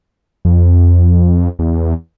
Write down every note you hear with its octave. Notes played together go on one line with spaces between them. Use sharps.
F2
E2